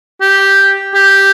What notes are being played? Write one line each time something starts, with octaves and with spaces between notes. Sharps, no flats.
G4
G4